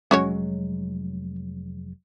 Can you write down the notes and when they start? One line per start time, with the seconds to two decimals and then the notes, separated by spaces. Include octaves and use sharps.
0.11 F1 F#3 G#3 C#4 F#4 C#5